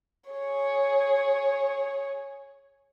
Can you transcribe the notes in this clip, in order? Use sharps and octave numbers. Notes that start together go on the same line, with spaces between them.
G#4 C#5